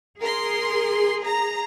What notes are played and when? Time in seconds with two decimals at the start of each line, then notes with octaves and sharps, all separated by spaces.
0.21 G#4 A#4 C6
1.24 A#5